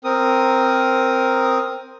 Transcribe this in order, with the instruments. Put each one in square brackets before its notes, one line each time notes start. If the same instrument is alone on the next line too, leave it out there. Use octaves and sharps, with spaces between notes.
[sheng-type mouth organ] C4 A#4 D#6